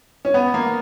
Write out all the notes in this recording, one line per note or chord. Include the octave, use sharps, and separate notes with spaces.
C#4
B3
A#3